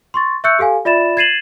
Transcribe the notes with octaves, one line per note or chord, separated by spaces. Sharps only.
C6 C#6 A6
E5 C#6 E6 F#6 G6 C#7
G4 A4 F5 G#5
F4 D5 E5 B5 A6 E7
G#6 A6 C7 D#7 E7 F#7